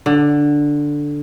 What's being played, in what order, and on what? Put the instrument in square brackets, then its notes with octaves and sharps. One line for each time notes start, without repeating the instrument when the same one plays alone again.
[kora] D3